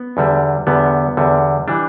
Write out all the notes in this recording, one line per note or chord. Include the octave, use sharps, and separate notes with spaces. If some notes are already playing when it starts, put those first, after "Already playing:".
Already playing: B3
E2 D3 G3
E2 D3 G3 B3
E2 D3 G3
E3 G3 D4